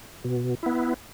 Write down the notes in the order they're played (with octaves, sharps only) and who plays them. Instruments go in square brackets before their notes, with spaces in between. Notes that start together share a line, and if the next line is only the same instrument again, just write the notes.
[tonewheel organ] B2
B3 E4